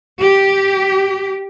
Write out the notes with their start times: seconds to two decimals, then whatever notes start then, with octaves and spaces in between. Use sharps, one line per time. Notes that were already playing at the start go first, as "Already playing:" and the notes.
0.19 G4